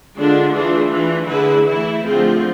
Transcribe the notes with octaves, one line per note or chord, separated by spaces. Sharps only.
D3 G#3 D4 F4
E3 A3 D4 F4 G#4
E3 A3 D4
D3 A3 E4 G#4 B4
E3 A3 E4
D3 F3 A3 C4 F4 G#4